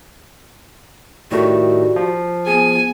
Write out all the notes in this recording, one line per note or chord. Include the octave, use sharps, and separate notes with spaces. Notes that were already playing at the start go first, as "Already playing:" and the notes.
A2 D#3 G3 A3 F#4
F3
B3 G#4 G#5